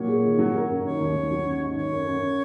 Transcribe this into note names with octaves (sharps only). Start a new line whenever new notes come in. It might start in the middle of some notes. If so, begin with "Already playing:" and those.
Already playing: A#2 F#3 C#5
G#4
D#3
F#3
A#4
F#2
D#3 C#5
D#2
D#2
F#3
C#4
G#2
D#3 C#5
F#2
F#2
C#4